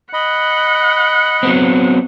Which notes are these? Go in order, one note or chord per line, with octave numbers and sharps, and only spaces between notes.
D#5 F#5 B5
F#3 B3 C4